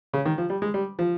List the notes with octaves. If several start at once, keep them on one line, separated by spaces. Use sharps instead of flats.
C#3
D#3
F3
G3
G#3
G3
F3